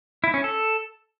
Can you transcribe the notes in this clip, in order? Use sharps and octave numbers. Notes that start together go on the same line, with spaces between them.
E4
C#4
A4